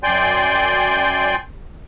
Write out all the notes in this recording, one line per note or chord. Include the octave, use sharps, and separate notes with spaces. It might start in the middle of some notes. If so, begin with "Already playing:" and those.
F#2 D5 G5 G#5 C6 G6